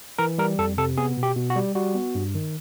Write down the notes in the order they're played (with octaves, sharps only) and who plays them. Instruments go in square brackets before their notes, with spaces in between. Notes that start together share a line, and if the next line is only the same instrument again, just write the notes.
[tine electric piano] E3 A#4
G3 A#4
F2 A4
C3 A4
B3 G#4
B2
G4
B2
F#4
G3
G3 F#4
B3
G2
D#3